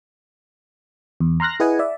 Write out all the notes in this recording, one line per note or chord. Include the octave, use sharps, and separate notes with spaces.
E2
A#5 C6 F6 F#6 A#6
E4 G#4 B4 D#5 F#5 G#5
D5 E5